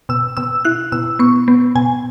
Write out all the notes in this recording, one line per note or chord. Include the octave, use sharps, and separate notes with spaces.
B2 E6
B2 E6
E4 F#6
B2 E6
B3 C#6
B3
B2 G#5